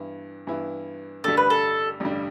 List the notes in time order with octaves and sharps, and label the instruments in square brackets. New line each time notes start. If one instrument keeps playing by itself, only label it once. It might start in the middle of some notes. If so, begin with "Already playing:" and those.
Already playing: [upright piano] G2 E3 B3 E4
G2 E3 B3 E4
[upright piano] A1 G2 D3 G3 [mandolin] A4
[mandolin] B4
A4
[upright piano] A1 G2 D3 G3